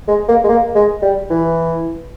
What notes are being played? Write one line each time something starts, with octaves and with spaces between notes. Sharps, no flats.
G#3
A#3
G#3
A#3
G#3
G3
E3